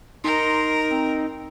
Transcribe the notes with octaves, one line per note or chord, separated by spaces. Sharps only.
D#4 A#4 C6
C4